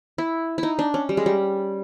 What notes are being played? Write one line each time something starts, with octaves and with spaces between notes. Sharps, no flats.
E4
D#4 E4
D4
C#4
G3
G#3
G3